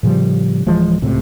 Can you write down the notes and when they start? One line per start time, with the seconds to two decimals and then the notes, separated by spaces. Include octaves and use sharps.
0.03 A2 C#3 F3 G3
0.66 D1 E3 F3 G#3
1.02 D1 C#2 A2 C3